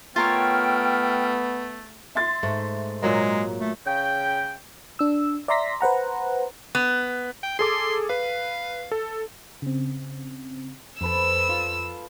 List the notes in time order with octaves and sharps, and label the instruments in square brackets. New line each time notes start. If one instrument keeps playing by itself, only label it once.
[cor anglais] A3 [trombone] B3 [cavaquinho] F4 A#4 C#5 [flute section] G5 F6
[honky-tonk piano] E5 C6 A6
[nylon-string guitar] G#2 [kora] A3
[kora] A#2 F#3 A#3 [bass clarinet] G#3
[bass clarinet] A3
[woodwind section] C#3 G5
[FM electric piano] D4 E6
D5 E5 A#5 C6 A#6 B6
B4 C5 F#5 A#5
[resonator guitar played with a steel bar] B3
[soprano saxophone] G5
[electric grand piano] G#4 A4 D6 [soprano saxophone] C6
[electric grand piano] B4 [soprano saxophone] F5
[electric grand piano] A4
[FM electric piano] C#3 C4
[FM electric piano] F2 [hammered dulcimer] A4 B4 C5 [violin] E6
[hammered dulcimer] F4